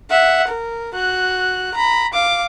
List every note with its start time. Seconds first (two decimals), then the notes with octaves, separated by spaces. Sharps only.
0.10 E5 F#5
0.47 A#4
0.94 F#4 F#6
1.74 A#5 B5
2.13 F5 D6